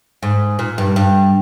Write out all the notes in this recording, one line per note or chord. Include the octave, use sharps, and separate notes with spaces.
G#2
A#2
G2
G2